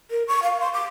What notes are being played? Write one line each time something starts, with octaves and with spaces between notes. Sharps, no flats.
A#4
C#6
F5
C6
D6